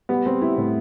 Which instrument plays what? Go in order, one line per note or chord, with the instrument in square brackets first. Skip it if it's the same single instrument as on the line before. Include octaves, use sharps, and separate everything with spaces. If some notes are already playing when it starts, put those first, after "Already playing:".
[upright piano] G3 B3
G3 C4
G3 E4
A2